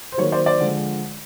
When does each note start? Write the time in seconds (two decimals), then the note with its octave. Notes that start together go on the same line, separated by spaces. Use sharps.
0.12 C5
0.18 D#3 F#3 A#3 C#5
0.32 C5 D5
0.46 C5 D5
0.60 D3 F3 G#3